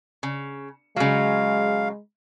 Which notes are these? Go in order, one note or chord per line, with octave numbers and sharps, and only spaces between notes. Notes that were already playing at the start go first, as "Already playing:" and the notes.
C#3
C#3 F#3 G#3 F5